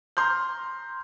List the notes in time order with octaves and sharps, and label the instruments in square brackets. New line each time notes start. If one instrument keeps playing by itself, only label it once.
[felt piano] A#5 C6 F6 G6